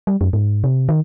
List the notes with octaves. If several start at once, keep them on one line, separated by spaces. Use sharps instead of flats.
G3
F#2
G#2
C3
D#3